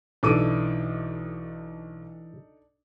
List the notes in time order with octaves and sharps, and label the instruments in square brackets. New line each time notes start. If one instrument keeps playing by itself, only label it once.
[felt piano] B1 D6 D#7 [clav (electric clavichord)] E3 [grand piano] D4 D#4 A4